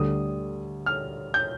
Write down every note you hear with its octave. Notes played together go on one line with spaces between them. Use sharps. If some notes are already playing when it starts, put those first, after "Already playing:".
Already playing: D2 D3 G3 D#6
F6
G6